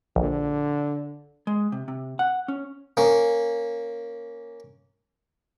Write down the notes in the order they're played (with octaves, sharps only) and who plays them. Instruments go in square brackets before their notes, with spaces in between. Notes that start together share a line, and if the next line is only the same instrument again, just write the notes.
[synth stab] A#1 [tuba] D3
[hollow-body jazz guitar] G#3
C3
C3
F#5
C#4
[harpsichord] A#3 C#4